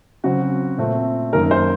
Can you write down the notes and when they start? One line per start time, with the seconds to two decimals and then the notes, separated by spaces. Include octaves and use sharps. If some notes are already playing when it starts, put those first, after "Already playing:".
0.24 C#3 F#3 C4 F#4
0.78 A#2 A3 C4
1.33 F#2 D#3 A#3 A#4
1.51 C5